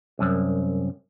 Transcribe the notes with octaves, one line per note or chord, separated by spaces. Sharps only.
C2 F#2